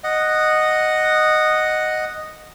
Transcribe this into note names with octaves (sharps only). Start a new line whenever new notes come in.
D#5 F#5